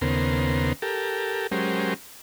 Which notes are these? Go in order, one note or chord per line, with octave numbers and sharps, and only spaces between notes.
D#2 C#3 B3 A#4 C5
G4 A4 A#4
F#3 G#3 C#4 G4 A#4 C5